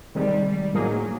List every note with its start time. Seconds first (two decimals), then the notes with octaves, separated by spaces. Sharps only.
0.15 C3 D#3 G3 G#3
0.44 G3
0.73 A2 F3 F#3 A#3 D#4 G#4